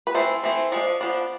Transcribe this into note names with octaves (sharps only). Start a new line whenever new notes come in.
B4
E3 A3 C4 A4 C5
E3 A3 C4
F3 G#3 D4
F3 B3 D4